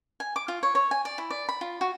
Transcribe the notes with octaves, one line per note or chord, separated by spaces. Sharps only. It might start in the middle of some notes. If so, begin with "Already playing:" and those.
G#5
D6
F4
C#5
C#5
G#5
D5
E4
D5
B5
F4
F#4